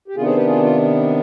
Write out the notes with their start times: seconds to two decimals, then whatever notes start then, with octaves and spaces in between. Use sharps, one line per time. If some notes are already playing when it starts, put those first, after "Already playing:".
0.08 G4
0.16 C3 D#3 B3 D4 F4 G#4
0.26 G#4 C5
0.36 G4 B4
0.46 F4 G#4
0.62 F4